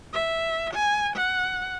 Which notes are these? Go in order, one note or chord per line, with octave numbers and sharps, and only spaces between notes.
E5
G#5
F#5